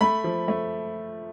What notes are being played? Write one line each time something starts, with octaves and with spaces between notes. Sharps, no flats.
A3 B5
F3
A3